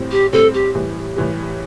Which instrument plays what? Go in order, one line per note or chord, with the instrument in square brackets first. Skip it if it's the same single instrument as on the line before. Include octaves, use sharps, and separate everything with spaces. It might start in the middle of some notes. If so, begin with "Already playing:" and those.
Already playing: [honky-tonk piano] A2 G3 C4
[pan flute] G4
[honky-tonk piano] A2 G3 C4 [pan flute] A4
[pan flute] G4
[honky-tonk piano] A2 E3 G3
A2 E3 G3